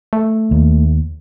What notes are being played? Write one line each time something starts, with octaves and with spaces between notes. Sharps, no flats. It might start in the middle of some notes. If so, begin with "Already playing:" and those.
A3
D#2